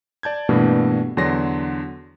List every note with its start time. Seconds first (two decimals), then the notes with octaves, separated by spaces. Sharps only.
0.23 D5 A5 G6 G#6
0.49 G2 B2 E3 A3 A#3 D4
1.17 E2 D3 F#3 D4 C6 A#6